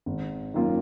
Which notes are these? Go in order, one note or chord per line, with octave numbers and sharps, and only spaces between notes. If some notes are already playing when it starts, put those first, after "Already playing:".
G#1
F#2 D#3 A#3 F4